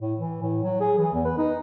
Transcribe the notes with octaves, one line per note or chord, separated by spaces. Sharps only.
A2
E3
A2
F#3
G#4
E3
E2
B4
D#4